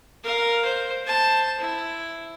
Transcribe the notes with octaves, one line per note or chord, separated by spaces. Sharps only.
A#4 F5
C5
C5 A5
E4